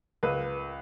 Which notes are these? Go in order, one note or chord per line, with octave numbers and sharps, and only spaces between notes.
C#2 B4